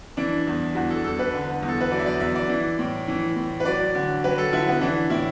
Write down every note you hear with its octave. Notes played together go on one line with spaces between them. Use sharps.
E3 D4
E2
E2 F#4
A4
E2 A4
B4
D3
E2
A4
B4
F#3 D5
E5
D5
E2 E5
D5
E3
A2
E3
A2
B4
F#3 D5
D3
F#3 B4
A4
D3 E4
B3
E3 D4
A2 E4